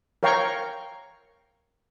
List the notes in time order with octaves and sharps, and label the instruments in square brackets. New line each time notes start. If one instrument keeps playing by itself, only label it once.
[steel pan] A#4 C#5 F5 G5 A#5 C#6